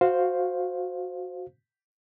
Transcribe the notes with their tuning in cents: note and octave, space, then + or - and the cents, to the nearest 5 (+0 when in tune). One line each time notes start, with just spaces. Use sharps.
F#4 -15 C5 +0 F5 +5